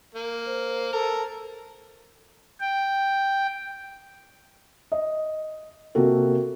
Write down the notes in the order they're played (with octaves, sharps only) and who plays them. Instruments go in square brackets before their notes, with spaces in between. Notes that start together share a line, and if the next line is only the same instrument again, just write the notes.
[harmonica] A#3
[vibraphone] C5
[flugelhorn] A4 [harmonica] A#4
[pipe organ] G5
[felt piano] D#5
C3 A#3 C4 F#4 A4